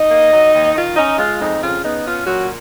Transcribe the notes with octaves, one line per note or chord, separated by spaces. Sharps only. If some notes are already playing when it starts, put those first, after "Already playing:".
Already playing: D#4 D#5
A#3
F#3
D#2
D#3 F4
C#4 D#4
G#3 F4
F2 D#4
C#3 F4
B3 D#4
C#4 F4
A#2 F#3 F#4